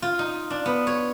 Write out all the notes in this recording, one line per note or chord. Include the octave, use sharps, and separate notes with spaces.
F4
D#4
D4
B3
C#5